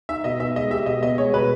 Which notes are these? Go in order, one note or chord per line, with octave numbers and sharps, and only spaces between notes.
D#4 E5
B2 D#5
B3 E5
G#3 D#5
G4 E5
B2 D#5
B3 D#5
G#3 C#5
B2 B4